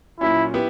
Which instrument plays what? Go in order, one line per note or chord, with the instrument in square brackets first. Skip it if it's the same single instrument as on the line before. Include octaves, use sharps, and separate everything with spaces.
[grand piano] A#2 F#3 C#4 [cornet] E4
[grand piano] B3 E4 G4